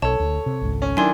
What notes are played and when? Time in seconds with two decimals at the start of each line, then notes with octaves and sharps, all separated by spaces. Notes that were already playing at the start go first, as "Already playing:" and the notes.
0.02 B1 A4 C#5 A5
0.20 D2
0.46 C3
0.61 G#1 C#2
0.82 C#4
0.97 D#3 F#3 D4 E4 G#5 C6 G#6